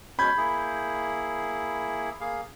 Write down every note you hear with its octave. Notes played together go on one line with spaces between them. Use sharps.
B2 G#3 C#4 B5 G6 G#6
A#3 E4 G#4
A#3 G#4 F5